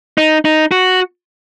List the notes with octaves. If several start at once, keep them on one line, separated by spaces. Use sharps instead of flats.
D#4
D#4
F#4